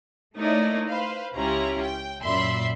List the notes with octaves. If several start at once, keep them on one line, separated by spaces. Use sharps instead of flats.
A3 A#3 D#4 E4 C#5 D5
B4 C5 F5
C#2 C#4 E4 F4 G4 A#5
G5
F#2 A#2 D5 E5 B5 C6